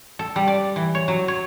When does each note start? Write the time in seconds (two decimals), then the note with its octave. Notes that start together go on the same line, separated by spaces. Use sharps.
0.19 A4
0.36 G3
0.48 D5
0.76 E3
0.95 C#5
1.08 F#3
1.28 C#5